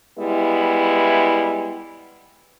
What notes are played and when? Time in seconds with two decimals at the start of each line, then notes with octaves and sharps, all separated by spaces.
0.19 G3 G#3 B3 E4